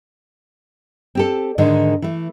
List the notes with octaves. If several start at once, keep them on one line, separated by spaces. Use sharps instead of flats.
C4 G4 A4
G#2 D3 D#3 G#3
E3 A3